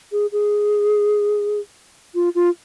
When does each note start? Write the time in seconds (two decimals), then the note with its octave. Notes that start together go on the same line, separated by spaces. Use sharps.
0.12 G#4
0.32 G#4
2.15 F4
2.35 F4